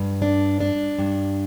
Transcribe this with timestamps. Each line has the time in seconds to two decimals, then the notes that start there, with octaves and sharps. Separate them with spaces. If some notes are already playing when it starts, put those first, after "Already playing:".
Already playing: G2
0.22 D4
0.60 D4
0.99 G2